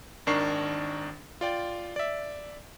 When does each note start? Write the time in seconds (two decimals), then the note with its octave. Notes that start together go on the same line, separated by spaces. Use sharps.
0.27 G#1 D#3 D4 A#4 C#6 C7
1.41 F4 D5 G5
1.96 D5 E5